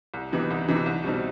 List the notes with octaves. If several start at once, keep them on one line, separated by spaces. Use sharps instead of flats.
C2
C3 E3 B3 D#4
C2
C3 E3 B3 D#4
C2
B2 G3 C4 D#4